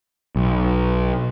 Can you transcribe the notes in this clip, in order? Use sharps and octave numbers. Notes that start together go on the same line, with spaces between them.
B1